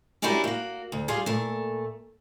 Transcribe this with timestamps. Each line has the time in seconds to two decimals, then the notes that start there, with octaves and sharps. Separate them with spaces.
0.22 C#4 D4 E4 F#4 G4 A#4
0.44 A#3 F#4
0.92 D2
1.08 G3 F4 G#4
1.26 A#2 A3